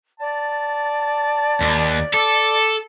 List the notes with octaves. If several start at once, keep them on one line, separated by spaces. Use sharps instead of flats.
D5 A5
D#2
A4 D6